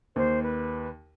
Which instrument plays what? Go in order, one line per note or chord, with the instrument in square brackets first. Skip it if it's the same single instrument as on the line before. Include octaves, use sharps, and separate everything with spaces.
[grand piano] D#2 [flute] C5
[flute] B4